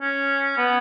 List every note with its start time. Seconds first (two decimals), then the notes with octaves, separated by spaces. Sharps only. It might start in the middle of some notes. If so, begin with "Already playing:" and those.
0.01 C#4
0.57 B3